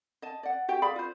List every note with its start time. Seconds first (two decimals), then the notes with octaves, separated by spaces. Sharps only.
0.22 D#5 A5
0.43 D5 F#5
0.68 F#4 G4 G5
0.82 G#4 D5 F5 B5
0.96 F4 C5